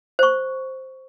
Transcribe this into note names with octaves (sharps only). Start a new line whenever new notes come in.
C5 C#6